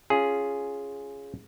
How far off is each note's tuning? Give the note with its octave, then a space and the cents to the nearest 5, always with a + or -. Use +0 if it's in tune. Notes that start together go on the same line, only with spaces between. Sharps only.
C#4 +5 F4 +0 G#4 +0